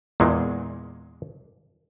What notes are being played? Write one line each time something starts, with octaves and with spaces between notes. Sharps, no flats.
E2 A#2 G#3